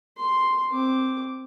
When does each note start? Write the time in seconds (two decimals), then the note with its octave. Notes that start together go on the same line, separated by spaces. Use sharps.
0.17 C6
0.70 C4 D6